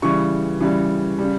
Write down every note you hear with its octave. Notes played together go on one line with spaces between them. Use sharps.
C#3 E3 G3 C#6
C#3 E3 G3
C#3 G3